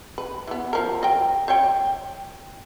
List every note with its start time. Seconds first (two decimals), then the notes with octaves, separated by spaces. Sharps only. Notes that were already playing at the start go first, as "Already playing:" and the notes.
0.18 B4
0.47 E3 B3
0.73 F3 A#4
1.03 D#5 G5
1.48 C5 C#5 G5